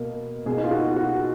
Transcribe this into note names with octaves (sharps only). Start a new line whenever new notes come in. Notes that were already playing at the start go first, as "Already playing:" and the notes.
Already playing: B2 A#3 A#4
B2 A#3 G#4
D#4
F4
F#4
F#4